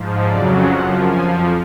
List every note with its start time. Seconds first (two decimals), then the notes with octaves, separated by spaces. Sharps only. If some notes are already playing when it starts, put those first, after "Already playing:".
Already playing: G#2 F3
0.28 F2 C#3 F#3 D5
0.67 F#2 F3 F#5
1.08 F2 F3 G#5